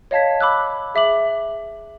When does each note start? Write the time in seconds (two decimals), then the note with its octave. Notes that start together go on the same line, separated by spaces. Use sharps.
0.11 C#5 D#5 F5 A5 G#6 B6
0.41 B5 D6 E6 F#6
0.95 G#4 E5 D6 F#7